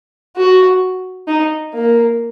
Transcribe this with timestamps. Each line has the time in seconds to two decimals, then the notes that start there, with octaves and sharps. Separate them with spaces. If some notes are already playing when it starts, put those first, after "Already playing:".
0.37 F#4
1.28 D#4
1.74 A#3